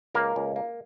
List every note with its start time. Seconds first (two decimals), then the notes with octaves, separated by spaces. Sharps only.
0.15 C#2 A#3 A#4
0.36 C#2
0.56 A#3